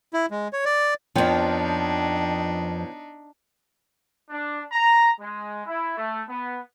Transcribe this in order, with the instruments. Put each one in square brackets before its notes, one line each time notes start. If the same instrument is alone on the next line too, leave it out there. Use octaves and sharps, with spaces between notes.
[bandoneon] E4
G#3
C#5
D5
[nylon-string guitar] F2 F3 [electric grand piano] B3 C#5 G5 [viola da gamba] D4 D#4
[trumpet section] D4
A#5
G#3
E4
A3
B3